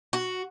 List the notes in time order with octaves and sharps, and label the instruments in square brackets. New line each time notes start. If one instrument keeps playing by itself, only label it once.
[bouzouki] F#4